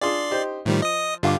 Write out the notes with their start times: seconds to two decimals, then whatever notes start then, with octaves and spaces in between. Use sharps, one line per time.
0.01 D4 F4 G#4 D5 C6
0.31 D#4 G4 C5
0.65 A2 D#3 F3 G3
0.82 D#5 D#6
1.23 G2 D3 F4 G4 F5 D6